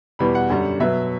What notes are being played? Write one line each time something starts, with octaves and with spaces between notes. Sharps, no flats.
E2 B2 G3 B3 B5
F#5
F#2 D3 G3
B2 F#3 B3 E5